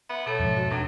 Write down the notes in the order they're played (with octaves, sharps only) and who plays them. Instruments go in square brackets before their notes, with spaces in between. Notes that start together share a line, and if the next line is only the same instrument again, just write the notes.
[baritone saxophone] B3 [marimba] E5
[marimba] B2 A4 C#5 [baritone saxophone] A3
[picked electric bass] F2 G#2
[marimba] F#4
[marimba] D#2 B2 D4 [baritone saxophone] F#3